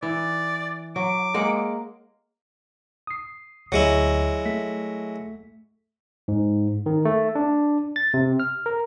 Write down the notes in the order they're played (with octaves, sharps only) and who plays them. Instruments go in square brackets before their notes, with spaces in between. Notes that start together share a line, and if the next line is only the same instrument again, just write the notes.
[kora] E3 [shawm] D5
[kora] F#3 [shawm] D6
[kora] G#3 A#3 F#5
[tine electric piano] D#6 C7
[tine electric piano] D2 [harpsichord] F#3 G#3 E4
[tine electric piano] A3 B6
G#2
D#3
A3
D4
A6
C3
F6
A#4